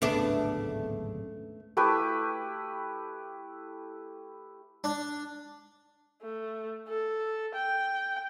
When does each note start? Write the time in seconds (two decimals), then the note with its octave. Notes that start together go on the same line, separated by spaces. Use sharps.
0.02 D1 G#1 C#3 A3 B3 D4
1.77 A3 E4 G4 B4
4.84 D4
6.23 A3
6.89 A4
7.55 G5